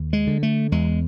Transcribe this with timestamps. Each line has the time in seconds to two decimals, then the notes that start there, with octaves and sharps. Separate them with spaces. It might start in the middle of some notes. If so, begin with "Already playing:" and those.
Already playing: D#2
0.13 G#3
0.27 D3
0.43 A3
0.72 E2 G#3